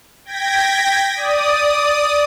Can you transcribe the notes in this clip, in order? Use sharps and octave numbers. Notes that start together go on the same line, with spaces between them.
G5 G#6 A#6 B6
D5 D#6